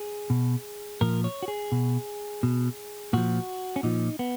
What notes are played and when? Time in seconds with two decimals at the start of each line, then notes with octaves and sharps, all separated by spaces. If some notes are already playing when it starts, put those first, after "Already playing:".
Already playing: G#4
0.30 B2
1.01 A#2 F3 A#4
1.24 C#5
1.43 F#4
1.48 G#4
1.72 B2
2.43 B2
3.13 A#2 F3 F#4
3.76 C#4
3.83 A#2 F3 D#4
4.19 B3